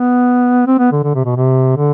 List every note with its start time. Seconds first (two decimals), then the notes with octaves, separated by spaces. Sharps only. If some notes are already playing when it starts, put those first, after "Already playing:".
Already playing: B3
0.67 C4
0.79 B3
0.92 D3
1.04 D3
1.15 C3
1.25 B2
1.36 C3
1.77 D3